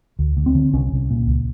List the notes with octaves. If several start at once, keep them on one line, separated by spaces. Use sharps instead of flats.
D2
D2
C4
D3
C2 C#4
C2
A#2
C#2